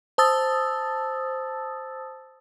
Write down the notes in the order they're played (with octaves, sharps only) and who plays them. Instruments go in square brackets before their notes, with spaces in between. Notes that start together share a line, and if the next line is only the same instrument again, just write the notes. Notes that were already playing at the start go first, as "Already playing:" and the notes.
[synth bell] C5 A5 D#6 E6 A6